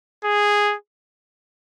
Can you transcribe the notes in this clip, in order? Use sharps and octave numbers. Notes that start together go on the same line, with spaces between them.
G#4